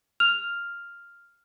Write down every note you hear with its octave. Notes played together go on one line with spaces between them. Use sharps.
F6 F7